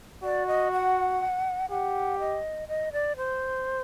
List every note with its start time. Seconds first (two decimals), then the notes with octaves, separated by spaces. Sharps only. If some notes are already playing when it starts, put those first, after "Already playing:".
0.23 F#4 D5
0.47 D#5
0.72 F#5
1.70 G4 F#5
2.19 D#5
2.68 D#5
2.93 D5
3.17 C5